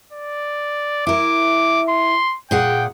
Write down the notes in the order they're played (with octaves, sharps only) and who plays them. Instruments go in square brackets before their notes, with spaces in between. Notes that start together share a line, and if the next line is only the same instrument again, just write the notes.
[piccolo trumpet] D5
[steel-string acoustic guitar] E4 A#4 [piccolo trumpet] D6
[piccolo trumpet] C6
[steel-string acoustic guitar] A#2 G#4 F#5 [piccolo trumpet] G5